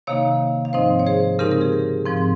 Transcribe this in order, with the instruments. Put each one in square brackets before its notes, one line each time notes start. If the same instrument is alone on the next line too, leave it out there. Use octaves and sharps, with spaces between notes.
[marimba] C3 D#3 A#3 D#4 C#5 F5
F5
G#2 F3 C4 D#4 C5 D#5
C#5
G#4 C5
C#3 G#3 C4 D#4 G4 A#4
A#4
G#4
G#2 F3 C4